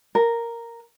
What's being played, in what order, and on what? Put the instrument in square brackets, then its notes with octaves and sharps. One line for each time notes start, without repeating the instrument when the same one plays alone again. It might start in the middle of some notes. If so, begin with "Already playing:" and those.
[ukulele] A#4